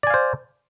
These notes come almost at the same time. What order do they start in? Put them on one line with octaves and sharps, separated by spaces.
D5 G#5 F5 C5